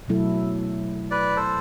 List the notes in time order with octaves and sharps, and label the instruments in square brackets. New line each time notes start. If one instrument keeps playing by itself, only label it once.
[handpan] B2 F#3 A3 E4 A4
[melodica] B4 D5
A4 C5